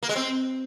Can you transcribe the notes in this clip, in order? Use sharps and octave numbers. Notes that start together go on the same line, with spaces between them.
A#3
G#3
C4